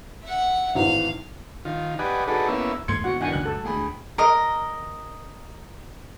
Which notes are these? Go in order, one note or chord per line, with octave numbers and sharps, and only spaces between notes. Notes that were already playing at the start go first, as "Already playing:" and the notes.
E5 F#5
G#1 A2 E3 F5
D#3 F4
G4 B4 D5 D#5 F#5 G#5
D#4 F#4 G#4 A4 B4 D5
A#3 B3 C#4 E4 E5
D#2 G#2 A3 C6 G#6 C#7
E2 A#2 D3 F#4 F#5
F#2 A2 D#3 E3 D4 F#5 G#5
F#1 C#2 F#6
A4
D2 A2 G#4 B5
A#4 D#5